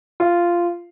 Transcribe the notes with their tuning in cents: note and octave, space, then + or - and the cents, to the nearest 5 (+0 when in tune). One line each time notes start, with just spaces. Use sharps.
F4 -10